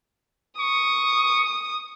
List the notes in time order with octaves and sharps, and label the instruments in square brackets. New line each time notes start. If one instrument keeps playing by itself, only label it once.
[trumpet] C#6 [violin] D#6